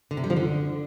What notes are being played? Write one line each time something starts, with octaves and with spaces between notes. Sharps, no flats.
D3
C3
G3
F3
D3